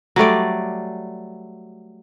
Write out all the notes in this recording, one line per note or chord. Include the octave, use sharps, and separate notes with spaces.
F#3 G3 A3 D5